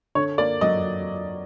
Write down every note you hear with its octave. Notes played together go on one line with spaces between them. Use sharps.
D3 C#5
A#3 D5
F#3 D#5